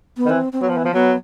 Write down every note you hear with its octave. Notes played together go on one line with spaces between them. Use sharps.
B3
D#3
E3 C4
C4
F#3 B3
F3
E3
F3
F#3 B3